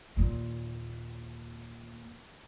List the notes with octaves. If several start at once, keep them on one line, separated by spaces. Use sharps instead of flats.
D#2 A#2